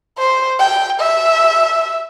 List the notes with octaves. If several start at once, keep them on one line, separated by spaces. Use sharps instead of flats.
C5
G5
E5